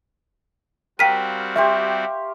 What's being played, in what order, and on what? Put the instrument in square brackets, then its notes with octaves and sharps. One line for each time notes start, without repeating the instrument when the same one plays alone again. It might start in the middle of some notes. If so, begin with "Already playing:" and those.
[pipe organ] G3 C4 F#4 [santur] A#4 F5 [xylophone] G5 B6 D#7
[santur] G4 C6 C#6 [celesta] E5